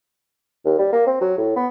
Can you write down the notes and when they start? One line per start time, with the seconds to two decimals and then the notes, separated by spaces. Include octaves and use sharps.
0.65 D#2
0.79 G3
0.93 A#3
1.07 C4
1.21 F#3
1.38 A2
1.56 B3